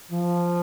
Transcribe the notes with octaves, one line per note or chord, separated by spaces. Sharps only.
F3